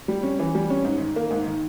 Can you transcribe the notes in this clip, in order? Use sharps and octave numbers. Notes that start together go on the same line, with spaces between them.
G3
C#4
E3
G3
C#4
G#2
D#3
A#3
G#2
D#3